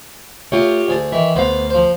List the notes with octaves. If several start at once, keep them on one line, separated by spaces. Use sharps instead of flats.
A3 F4 G4 C#5
D2 G#4 A5
D#3 E3 E5
D2 B3 C5 F5
F3 C5